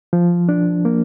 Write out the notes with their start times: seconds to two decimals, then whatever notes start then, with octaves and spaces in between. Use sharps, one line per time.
0.13 F3
0.49 D4
0.85 A#3